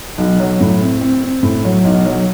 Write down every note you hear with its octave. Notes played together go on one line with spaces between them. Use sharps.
B1
F#3
A2
C4
C4
C4
A2
F#3
B1
F#3